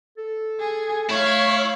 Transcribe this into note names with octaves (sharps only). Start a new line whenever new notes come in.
A4
G#4
A3 E4 C#5 F5